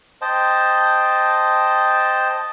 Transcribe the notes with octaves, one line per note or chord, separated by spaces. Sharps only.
C5 D#5 G5 A5